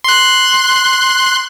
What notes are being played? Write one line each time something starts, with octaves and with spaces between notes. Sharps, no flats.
C6 F#6